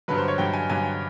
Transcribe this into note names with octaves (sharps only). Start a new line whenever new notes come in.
G2 D3 F#3 B4
C5
C#5
G2 D3 F#3 G5
G#5
G2 D3 F#3 G#5